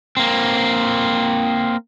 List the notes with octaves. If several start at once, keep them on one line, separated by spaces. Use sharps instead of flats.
A#3 C4